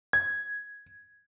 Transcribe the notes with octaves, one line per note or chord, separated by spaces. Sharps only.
G#6